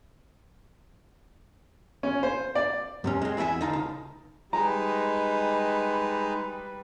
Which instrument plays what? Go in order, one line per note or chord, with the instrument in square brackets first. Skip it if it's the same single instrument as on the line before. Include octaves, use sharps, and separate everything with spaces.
[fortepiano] C#4
C5
D5
[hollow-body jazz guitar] F#2 C3 C#4
G#3 C4
E2 E4 F4 E5 G#5
D3 D#4 F5
C#2
[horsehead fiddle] G3 B4 [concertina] G#3 D#4 [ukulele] A#5